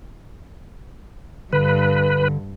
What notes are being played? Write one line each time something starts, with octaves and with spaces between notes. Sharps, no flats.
G2 D3 B4